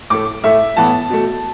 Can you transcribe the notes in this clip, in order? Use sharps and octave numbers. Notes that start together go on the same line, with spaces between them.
A2 A3 D6
A2 A3 E5
A2 E3 B3 A5
B2 A3